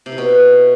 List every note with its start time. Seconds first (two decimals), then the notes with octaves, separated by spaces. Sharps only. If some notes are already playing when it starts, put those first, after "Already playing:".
0.06 C3
0.12 E4
0.18 B2